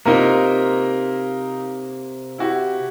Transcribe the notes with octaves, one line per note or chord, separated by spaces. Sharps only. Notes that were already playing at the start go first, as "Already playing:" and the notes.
C3 A#3 D#4 F4 A#4
E4 F#4 G4